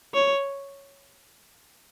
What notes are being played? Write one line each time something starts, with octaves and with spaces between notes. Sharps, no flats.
C#5